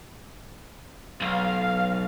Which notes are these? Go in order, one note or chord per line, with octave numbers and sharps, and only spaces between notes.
B1 F5